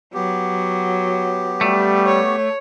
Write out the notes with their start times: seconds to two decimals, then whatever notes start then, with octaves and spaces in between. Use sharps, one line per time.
0.14 F#3 B3 G4
1.61 G3 A3
2.06 C#5